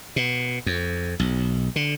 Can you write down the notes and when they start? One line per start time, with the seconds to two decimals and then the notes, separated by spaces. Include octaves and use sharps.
0.16 B2
0.66 F2
1.19 B1
1.76 D3